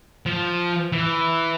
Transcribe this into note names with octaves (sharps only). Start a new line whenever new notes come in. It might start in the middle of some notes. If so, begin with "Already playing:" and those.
F3
E3